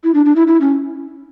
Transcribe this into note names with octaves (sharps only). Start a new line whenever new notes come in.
E4
D4
D4
E4
E4
C#4